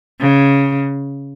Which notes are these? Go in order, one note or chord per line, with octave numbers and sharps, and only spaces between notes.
C#3